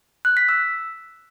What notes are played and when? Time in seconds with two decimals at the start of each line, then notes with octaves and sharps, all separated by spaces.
0.25 F#6
0.37 B6
0.49 E6